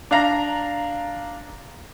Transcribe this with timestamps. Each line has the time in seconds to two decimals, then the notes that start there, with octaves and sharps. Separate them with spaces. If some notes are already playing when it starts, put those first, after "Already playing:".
0.11 D4 F5 A#5 A#6